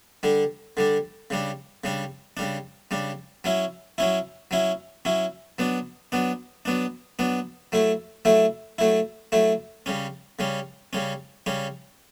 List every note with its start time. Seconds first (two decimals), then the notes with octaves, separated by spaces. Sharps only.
0.23 D3 G3 D4
0.77 D3 G3 D4
1.30 C#3 G3 D4
1.84 C#3 G3 D4
2.37 C#3 G3 D4
2.91 C#3 G3 D4
3.44 F#3 C#4 E4
3.98 F#3 C#4 E4
4.51 F#3 C#4 E4
5.05 F#3 C#4 E4
5.59 F#3 B3 D4
6.12 F#3 B3 D4
6.65 F#3 B3 D4
7.19 F#3 B3 D4
7.72 F#3 A3 E4
8.25 F#3 A3 E4
8.78 F#3 A3 E4
9.32 F#3 A3 E4
9.86 C#3 G3 C#4
10.39 C#3 G3 C#4
10.93 C#3 G3 C#4
11.46 C#3 G3 C#4